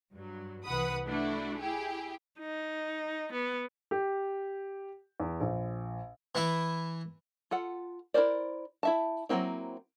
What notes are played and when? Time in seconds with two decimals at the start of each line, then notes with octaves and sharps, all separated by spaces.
0.13 G2 F#3
0.65 C2 E3 B4 F#5 B5 D#6
1.07 A3 D4 E4 F#4
1.58 E4 G4 G#4
2.39 D#4
3.33 B3
3.91 G4
5.20 E2
5.41 A#1
6.35 E3 E4
7.51 F4 A4 F#5
8.14 E4 F4 A#4 C5 D5
8.83 E4 E5 A5
9.29 F#3 A3 A#3 C4 E4